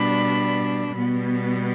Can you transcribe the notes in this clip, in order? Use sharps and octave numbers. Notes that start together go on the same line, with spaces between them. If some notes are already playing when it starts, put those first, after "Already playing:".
Already playing: B2 G3 D4 B5
B2 G3 B3